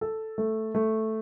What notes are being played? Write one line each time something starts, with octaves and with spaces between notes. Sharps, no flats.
A4
A3
A3